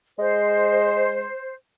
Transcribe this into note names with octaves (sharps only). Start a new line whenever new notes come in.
G#3 C5